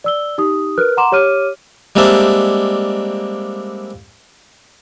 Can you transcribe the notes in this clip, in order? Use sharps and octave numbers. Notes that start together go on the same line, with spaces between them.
D5 E6 G7
D#4 G4 D#6
A#4 B4 F6 F#6
F#5 A#5 C6 D6 E7
G4 C#5 D6 F6 D#7
G3 G#3 A#3 C4 D4 E5